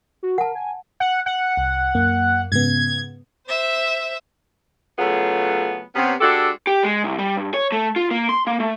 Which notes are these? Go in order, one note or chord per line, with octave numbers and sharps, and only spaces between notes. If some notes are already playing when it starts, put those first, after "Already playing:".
F#4
A#4 F#5 A5
G#5
F#5
F#5
C2
F#2 A#3
G#2 C#3 B3 G#6
C5 E5
C#3 F#3 A3 B3 F4 G#4
C3 B3 C#4
G#3 D4 F#4 G4 A4
G4
G#3
C2
G3
G2
C#5
A3
F4
A#3
C6
A#3
A3